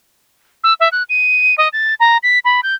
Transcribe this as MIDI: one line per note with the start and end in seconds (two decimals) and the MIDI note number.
0.64 0.74 88
0.80 0.89 76
0.92 1.03 90
1.09 1.55 99
1.58 1.68 75
1.73 1.94 93
2.00 2.18 82
2.23 2.39 95
2.45 2.60 83
2.63 2.75 91